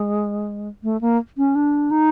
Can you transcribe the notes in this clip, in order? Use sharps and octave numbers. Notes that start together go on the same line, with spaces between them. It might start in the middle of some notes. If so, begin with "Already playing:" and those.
Already playing: G#3
A3
A#3
C#4
D4
D#4